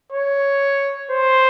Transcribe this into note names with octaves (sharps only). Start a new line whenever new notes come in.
C#5
C5